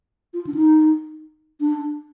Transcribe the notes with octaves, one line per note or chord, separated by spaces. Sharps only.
F4
D4
D#4
D4